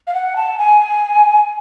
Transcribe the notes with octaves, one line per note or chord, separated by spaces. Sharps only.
F5
F#5
A5
G#5